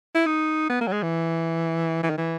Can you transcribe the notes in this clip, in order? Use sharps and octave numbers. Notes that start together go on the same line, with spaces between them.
E4
D#4
B3
A#3
F#3
G#3
E3
E3
D#3
E3